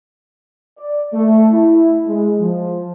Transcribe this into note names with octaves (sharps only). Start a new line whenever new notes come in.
D5
A3
E4
G#3
F3